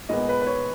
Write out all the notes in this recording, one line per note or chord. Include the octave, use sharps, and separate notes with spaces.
A#2 G#3 B3 D#5
B4
B4
C#5